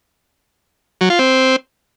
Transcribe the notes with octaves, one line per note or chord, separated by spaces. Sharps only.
F#3
F4
C4